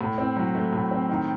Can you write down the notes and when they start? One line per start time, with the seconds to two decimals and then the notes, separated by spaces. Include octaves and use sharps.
0.01 A2
0.18 C4
0.36 F#3
0.55 A3
0.73 A2
0.91 C4
1.09 D#3